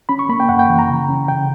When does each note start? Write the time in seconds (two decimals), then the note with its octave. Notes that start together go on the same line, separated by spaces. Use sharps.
0.09 C#4 B5
0.19 C#6
0.29 A#3 B5
0.40 G5
0.49 F#2 F#5
0.59 G5
0.69 E3
0.79 A#5
0.89 C#3
1.09 C#4
1.28 C#3 G5